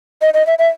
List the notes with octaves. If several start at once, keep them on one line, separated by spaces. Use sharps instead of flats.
D#5
D#5
E5
E5